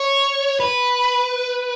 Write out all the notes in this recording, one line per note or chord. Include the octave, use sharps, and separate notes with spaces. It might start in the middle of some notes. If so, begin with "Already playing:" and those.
Already playing: C#5
B4